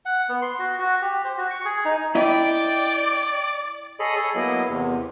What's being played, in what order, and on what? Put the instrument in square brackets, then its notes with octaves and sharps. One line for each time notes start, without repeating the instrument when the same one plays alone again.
[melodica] F#5
B3
C6
F#4
F#4
G4
C5
F#4
C#6
G#4
D#4
[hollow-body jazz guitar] E4 D#5 [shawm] D5 [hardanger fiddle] G5
[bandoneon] G#4 A4 C#5 D#5 B5
G#4 A4 C#5
F#3 A#3 B3 E4 D#5
E2 C3